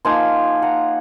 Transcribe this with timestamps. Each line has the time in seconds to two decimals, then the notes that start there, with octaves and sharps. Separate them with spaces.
0.05 F3 A#3 D#4 G#5 C6
0.62 F#5 A#5